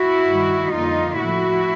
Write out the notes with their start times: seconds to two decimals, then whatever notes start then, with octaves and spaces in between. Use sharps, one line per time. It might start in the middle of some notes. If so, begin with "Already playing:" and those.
Already playing: E4 F#4
0.28 G2 D#3 G3
0.73 F2 D3 G3 A#3 D#4 F4
1.18 A2 F3 A3 E4 F#4